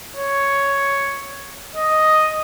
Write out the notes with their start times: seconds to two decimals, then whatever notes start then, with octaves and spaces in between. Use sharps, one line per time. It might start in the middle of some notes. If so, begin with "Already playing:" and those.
0.16 C#5
1.75 D#5